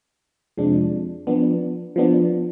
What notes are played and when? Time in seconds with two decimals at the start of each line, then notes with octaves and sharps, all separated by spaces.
0.57 F2 C3 F3 G#3 D4
1.27 F3 B3 D4
1.96 F3 B3 D4